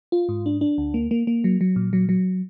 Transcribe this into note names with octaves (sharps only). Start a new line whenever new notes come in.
F4
G#2
D4
D4
D2
A#3
A#3
A#3
F#3
F#3
A#2
F#3
F#3